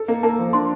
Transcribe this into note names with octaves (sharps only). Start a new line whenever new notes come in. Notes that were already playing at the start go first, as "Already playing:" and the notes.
Already playing: A4
A#3
A#3 A5
F3
D4 C6